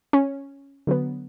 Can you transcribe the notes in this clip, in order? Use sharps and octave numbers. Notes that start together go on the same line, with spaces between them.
C#4
D3 F#3 B3